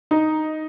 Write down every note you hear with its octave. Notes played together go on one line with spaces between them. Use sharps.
D#4